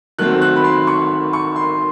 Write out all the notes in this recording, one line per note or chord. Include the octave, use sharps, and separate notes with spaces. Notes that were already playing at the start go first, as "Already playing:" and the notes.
D#3 F#3 A3 C4 F#6
F#6
B5
C6
C#6
C#6
C6